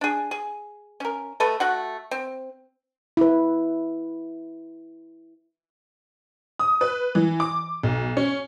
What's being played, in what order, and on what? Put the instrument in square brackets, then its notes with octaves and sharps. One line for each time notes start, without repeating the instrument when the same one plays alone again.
[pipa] D4 G#4
G#4
C#4 A#4
A3 A4 B4 D#5
A3 F#4 F#5
C4
[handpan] E4 B4
[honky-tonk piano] D#6
B4
E3
D6
B1
C#4